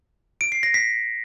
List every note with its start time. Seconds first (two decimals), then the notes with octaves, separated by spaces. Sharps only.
0.41 D7
0.52 C7
0.63 A#6
0.74 B6